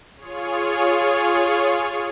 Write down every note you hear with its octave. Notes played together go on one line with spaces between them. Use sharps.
F4 G#4 C#5